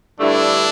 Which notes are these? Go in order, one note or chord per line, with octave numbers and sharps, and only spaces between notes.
G2 D3 A3 D4 E4